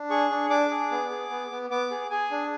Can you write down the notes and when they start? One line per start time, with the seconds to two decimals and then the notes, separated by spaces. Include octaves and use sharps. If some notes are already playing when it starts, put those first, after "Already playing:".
Already playing: D4
0.10 G#4 C#6
0.31 D4
0.50 D4 D6
0.70 G#4
0.91 B3
1.10 G#4
1.30 B3
1.51 B3
1.70 B3 D6
1.91 G#4
2.10 G#4 G#5
2.31 D4